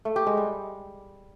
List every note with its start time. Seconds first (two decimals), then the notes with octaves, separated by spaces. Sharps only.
0.05 A3
0.16 G4
0.27 G#3
0.37 G3